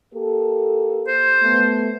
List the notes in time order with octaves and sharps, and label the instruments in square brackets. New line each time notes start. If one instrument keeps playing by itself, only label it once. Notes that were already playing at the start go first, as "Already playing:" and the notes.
[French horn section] A#3 G4 A4
[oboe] C5
[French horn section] A3 B3